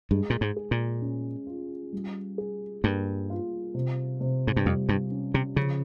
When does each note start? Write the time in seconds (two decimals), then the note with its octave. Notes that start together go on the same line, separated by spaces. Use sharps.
0.11 G2 G#3
0.30 A#2
0.41 G#2
0.56 G#4
0.71 A#2
1.02 C#4
1.47 F4
1.93 G3
2.38 G#4
2.84 G2 A#3
3.30 F4
3.74 C3
4.21 C3
4.47 G#2
4.56 G2
4.66 F2 G3
4.89 G2
5.11 C#4
5.34 C3
5.56 C#3 F3